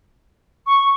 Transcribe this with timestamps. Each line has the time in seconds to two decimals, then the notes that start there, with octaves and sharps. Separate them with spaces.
0.67 C#6